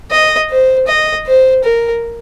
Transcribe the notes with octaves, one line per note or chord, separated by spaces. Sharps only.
D#5
C5
D#5
C5
A#4